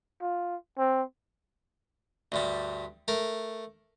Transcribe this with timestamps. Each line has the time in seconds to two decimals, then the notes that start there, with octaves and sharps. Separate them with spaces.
0.22 F4
0.78 C4
2.32 D2 G2 G3
3.08 A3 A#4